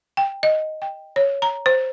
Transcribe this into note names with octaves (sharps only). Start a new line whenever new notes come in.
G5
D#5
G5
C#5
A#5
C5